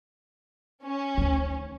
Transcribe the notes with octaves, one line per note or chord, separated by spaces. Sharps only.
C#4
D2 D#3